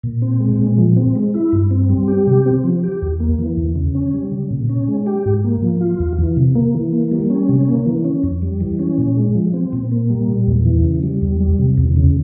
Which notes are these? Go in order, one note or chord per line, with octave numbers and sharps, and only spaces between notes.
A#2
C4
G#3
A#2
F3
C4
G#3
E4
G2
C4
G3
G4
C3
C4
F3
G4
E2
A#3
E3
E2
C#3
C#4
G3
C#3
A#2
C#4
G#3
G4
G#2
A#3
F3
F4
E2
E3
C3
A#3
E3
A#3
G3
C#4
C3
A#3
E3
C#4
F2
G3
E3
C#4
A#2
G#3
F3
C4
A#2
A#3
G3
A#2
E2
E3
C#3
G3
E2
G3
C3
E2
C#3